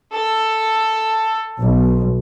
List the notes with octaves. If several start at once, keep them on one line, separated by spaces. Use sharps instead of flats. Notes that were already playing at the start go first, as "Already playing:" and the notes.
A4
B1